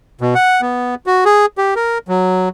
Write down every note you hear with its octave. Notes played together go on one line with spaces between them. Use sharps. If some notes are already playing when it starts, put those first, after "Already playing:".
B2
F#5
B3
F#4
G#4
G4
A#4
F#3